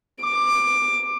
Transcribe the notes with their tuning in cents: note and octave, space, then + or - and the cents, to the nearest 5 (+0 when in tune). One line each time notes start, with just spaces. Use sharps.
D6 +15